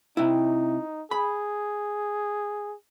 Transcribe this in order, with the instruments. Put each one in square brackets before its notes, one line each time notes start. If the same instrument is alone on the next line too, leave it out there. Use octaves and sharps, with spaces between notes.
[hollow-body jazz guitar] C3 E4 [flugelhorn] D#4
[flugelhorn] G#4 [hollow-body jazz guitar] B5